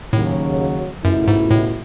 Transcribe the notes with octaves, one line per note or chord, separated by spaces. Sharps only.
D#2 A2 C#3 F#3
C#2 F#2 B2 A3 E4
G#2
A2